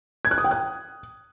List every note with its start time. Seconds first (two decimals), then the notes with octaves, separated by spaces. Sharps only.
0.25 G#6
0.31 F#6
0.38 D#6
0.44 G5
0.51 F#6